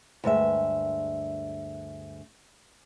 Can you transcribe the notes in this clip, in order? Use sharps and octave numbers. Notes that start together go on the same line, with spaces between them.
D2 G2 G#3 E5